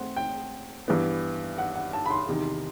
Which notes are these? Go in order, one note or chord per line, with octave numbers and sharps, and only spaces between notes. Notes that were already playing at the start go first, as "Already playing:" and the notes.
Already playing: A3 C4 F#5
G5
G2 E3 B3
F#5
F#5
A5
B5
C6
E2 C3 D#3